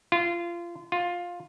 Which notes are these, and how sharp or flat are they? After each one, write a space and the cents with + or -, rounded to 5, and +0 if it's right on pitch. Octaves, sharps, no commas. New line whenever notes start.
F4 -25
F4 +10